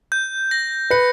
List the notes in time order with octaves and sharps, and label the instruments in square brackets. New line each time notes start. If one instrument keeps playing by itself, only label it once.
[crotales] G6
A#6
[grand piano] B4 [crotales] C#7